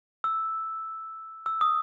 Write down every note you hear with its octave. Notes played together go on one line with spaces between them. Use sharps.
E6
E6
D#6